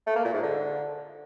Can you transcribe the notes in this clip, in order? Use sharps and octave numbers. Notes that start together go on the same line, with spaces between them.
A3
A#3
A#2
G#2
D3